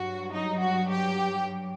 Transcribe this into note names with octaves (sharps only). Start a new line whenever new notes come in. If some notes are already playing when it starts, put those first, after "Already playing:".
Already playing: G2 F#3 F#4
D#4
F#4
G4